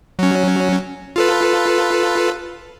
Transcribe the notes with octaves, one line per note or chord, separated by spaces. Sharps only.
F#3 C#4
F4 A4 B4